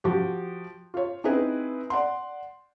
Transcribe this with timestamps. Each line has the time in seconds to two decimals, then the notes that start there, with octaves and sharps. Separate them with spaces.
0.04 F3 F#4 G4
0.94 F4 C#5
1.24 C4 D#4 E4 G#4 B4
1.90 D5 F#5 C6